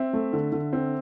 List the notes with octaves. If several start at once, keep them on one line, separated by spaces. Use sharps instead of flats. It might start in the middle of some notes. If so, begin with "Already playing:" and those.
Already playing: C4 E5
A3
D3
D3
C4